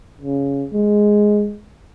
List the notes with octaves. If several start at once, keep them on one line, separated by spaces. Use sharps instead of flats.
C#3
G#3